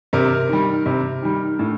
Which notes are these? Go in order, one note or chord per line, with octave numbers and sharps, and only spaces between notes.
C3 A#4
D#3 G3
C3
D#3 G3
A2